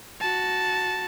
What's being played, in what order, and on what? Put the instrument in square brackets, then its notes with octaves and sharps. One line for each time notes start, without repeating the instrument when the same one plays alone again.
[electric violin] F#4 A5